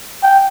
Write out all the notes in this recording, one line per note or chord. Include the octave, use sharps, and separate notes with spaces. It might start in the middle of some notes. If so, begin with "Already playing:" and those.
G5